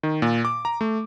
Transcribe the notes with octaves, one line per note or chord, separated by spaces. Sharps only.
D#3
A#2
D6
A#5
A3